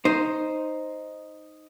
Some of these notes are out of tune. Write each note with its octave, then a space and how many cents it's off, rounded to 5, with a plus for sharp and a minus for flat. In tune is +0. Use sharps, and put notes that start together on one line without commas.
D#4 +0 C5 +0